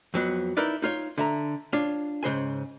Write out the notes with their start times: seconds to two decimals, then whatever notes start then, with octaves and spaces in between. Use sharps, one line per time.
0.14 F2 F#3 B3
0.57 D#4 E4 A#4 B4 D5
0.82 D#4 F4 C#5
1.18 D3 E5 A#5
1.73 D4 F4 C#5
2.23 G#2 C#3 C5 G#5